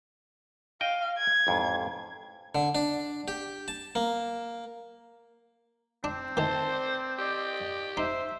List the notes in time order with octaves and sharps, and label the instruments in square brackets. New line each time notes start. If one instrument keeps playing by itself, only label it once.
[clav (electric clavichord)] D#5 G5 [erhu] F5
[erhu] G#6
[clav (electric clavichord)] A1 F2 G#2
[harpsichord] D3
D4
G4
A5
A#3
[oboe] C4 [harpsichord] D4
[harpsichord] D#3 E3 [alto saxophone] C5 [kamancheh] A5
[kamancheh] D5
[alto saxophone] G4 [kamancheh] D5 D#5
[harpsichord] D#4 [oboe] C5 [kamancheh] E5